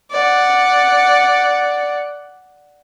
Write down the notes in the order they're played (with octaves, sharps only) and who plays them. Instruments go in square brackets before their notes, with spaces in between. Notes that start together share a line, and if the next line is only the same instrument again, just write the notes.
[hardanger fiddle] D5 F#5